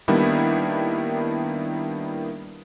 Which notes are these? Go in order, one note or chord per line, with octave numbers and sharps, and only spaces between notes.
D#3 G3 A#3 B3 D4 E4